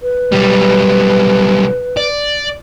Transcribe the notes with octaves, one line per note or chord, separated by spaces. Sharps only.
B4
B1 G3
D5